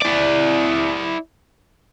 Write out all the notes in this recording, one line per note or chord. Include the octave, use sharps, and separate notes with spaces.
E4 D5